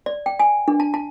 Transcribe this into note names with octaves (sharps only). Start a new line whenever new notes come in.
D5
G5
G#5
D4
A5
A5